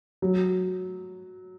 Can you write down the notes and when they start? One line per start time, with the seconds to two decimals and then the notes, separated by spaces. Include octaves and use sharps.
0.22 F#3